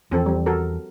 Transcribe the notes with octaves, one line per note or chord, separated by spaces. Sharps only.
E2 F3 C4 A4
G3 C4
F#4 A4 A#4